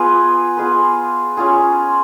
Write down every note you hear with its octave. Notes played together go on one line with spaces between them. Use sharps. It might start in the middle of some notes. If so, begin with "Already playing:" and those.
Already playing: B3 F4 G#4 B4
B3 F4 G#4 B4
C#4 F4 G#4